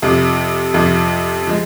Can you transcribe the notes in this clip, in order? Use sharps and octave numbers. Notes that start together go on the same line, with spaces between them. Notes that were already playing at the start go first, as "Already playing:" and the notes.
F2 C3 F3
F2 C3 F3
F3 G#3